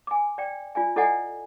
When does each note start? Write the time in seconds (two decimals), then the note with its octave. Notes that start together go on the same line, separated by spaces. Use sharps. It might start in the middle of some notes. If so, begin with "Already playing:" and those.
0.07 G#5 D6
0.38 D5 G5
0.75 F4 D5 G#5
0.96 E4 A4 D5 D#5 F#5 G#5